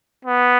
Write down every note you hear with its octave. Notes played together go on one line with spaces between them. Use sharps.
B3